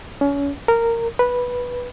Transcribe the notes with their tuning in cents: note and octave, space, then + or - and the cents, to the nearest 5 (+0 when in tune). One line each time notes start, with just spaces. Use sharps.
C#4 +30
A#4 -15
B4 -10